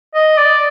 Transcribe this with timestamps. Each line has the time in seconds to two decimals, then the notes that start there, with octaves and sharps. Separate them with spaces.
0.15 D#5
0.38 D5